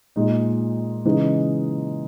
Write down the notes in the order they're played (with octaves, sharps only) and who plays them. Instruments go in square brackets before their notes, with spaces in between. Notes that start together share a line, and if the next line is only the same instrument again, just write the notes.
[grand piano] A#2 G#3 D#4
C#3 E3 G#3 D#4